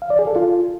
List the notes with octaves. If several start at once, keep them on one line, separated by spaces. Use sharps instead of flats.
F5
D5
G#4
A4
F4